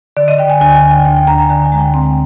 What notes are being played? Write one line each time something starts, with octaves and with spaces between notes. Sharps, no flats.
D3 D5
D#5
D3 G5
G#5
D2 G#5
G#5
D2
G5
D2 G5
G5
D2 A#5
G#5
D3 A#5
G#5
G#3
G5
C4